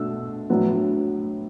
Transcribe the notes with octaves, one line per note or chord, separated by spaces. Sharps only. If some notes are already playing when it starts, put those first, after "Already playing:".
Already playing: B2 A3 D4 E6
A2 F#3 B3 D4